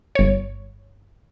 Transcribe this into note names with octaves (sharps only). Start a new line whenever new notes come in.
G1 C#5